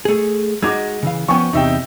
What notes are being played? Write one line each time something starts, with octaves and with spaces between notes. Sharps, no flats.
A3 G#4
G#3 D#4 F#4 D#5 D6 G#6
C#3 E3 F5
F3 B3 C#4 G5 G#5 C#6
E2 C3 D#4 E5 G5